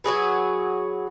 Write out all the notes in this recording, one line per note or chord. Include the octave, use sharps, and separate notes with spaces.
F#3 F#4 G#4 B4